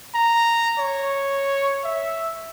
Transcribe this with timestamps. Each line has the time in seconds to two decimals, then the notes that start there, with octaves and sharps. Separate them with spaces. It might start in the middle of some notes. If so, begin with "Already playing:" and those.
0.15 A#5
0.79 C#5
1.85 E5